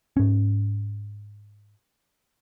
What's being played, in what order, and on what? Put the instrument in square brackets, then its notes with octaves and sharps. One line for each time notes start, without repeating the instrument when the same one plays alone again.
[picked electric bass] G#2 C#4